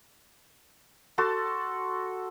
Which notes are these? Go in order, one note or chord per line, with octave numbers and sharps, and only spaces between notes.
F#4 A4 A5 C6